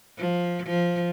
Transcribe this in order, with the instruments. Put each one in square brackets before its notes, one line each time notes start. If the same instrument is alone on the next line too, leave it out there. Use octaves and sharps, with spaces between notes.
[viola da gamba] F3
F3